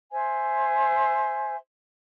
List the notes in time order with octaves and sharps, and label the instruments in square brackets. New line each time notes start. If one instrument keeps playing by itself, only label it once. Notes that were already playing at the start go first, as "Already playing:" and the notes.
[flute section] C5 E5 G#5